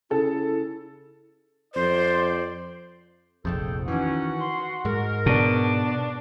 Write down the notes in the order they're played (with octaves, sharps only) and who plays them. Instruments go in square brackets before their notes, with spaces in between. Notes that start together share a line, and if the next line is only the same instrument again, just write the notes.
[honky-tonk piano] C#3 A4 [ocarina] E4
[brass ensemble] F2 D5 [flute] C5
[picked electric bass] F1 A#1 F2 [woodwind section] G#4 A4 G5
[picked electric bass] D#3 E3 [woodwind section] C#4 [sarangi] F#4
[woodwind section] C6
[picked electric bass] G#2 G#3 [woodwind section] A#4
[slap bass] B2 [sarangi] D4
[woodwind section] D5